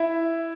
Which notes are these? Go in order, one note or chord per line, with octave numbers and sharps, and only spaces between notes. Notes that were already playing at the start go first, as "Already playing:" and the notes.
Already playing: E4 E5